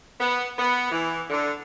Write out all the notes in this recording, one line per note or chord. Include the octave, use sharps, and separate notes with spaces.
B3
B3
E3
D3